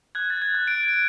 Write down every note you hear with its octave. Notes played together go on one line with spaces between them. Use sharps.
F#6 G#6
A6
G#6
F#6
D7
D7